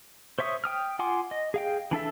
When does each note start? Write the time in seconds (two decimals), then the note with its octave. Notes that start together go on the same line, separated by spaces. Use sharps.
0.39 C5 C#5 E5 C#6 D#6
0.64 G5 D#6 F6
0.99 F4 F#5 G#5 C6 D6
1.31 D#5
1.54 G#4 F5 G5
1.91 E3 D4 A4 E5